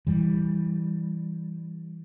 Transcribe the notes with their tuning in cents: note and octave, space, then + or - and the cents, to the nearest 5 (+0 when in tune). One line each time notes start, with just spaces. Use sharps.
E3 +0 G3 +0